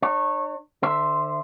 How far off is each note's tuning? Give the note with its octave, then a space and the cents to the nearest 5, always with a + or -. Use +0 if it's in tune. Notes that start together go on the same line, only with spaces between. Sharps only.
D4 +45 C#5 -20
D3 +40 C5 +0 E5 +5